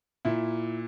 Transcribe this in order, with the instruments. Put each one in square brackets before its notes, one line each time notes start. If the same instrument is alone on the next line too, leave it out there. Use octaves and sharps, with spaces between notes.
[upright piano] A#2 E4